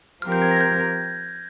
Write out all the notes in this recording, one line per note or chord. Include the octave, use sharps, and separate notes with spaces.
F3 C4 G4 A#4 F6
G6
G#6
A#6
G#6
G6